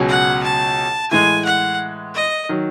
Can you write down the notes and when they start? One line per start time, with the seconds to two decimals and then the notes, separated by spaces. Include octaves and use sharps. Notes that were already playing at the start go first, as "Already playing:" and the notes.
Already playing: C#2 B2 F#3 C#4 G#4
0.08 F#5
0.43 A5
1.11 A2 E3 G#3 G#5
1.45 F#5
2.14 D#5
2.49 D#3 F#3